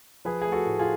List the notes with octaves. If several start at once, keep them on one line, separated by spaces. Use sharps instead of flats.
F3 G#4 B4
A3 G#4
F#4 A4
A2
F4 G#4